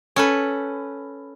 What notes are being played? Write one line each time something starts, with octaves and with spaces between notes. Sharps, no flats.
C#4 A4 B4